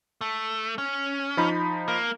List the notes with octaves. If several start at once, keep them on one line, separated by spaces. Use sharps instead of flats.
A3
C#4
F3 D#4 B5
A#3